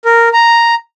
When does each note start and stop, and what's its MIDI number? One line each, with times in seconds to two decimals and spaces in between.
0.05 0.29 70
0.33 0.75 82